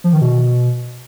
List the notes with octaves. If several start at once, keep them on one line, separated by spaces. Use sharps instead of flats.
F3
D#3
B2